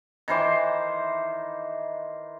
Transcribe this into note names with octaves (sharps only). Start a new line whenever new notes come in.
D#3 E3 C5 D6